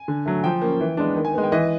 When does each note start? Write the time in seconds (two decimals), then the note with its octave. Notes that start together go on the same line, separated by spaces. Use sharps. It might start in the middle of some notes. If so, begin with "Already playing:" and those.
Already playing: G#5
0.08 D3
0.26 F#3 A3
0.44 F3 G5
0.62 A#3 C#4
0.80 E3
0.97 G#3 B3 D4
1.16 D#3
1.25 G#5
1.34 G#3 B3
1.43 G5
1.52 E3 D#5